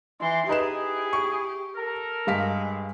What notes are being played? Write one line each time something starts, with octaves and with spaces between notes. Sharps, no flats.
E3 E4 C6
D#4 E4 G4 G#4 B4 E7
C#6
A4 A#4
G2 G#3 F5 B6